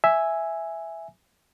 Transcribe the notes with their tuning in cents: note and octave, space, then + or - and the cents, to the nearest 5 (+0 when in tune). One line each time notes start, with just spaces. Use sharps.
E5 +0 G#5 +0